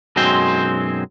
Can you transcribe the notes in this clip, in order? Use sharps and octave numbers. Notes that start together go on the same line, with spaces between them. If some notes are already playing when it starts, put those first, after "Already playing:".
B1 F#2 F#3 G#3 C4 C5